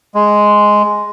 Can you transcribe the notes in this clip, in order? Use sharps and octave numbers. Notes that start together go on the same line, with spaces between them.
G#3